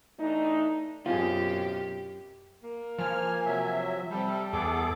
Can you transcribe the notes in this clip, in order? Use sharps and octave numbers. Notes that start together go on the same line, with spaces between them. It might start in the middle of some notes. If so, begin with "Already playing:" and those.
E3 A3 D4 D#4
F#2 B2 C4 F4 G4 G#4
A#3
F3 G#5 F6
C3 F#3 E5
C3 G3 A4
E2 B3 G#4 A4 D6